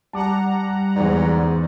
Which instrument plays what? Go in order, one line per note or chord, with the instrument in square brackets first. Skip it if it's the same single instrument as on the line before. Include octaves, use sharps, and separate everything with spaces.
[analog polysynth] G3 F#5 A#5 [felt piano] A5 D6
[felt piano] E2 D5 [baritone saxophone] G#2